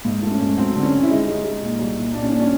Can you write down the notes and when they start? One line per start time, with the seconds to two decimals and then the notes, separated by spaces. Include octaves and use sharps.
0.05 G#2
0.23 A3
0.31 C#4
0.40 G#2
0.57 F#3 C4
0.75 D3
0.83 C#4
0.92 D3
1.03 E4
1.10 G#3 D#4
1.27 G#3
1.44 G#3
1.62 A#2
1.79 C2
1.96 A#2
2.14 A#2 D4
2.22 C#4
2.31 A#2 D4
2.40 C#4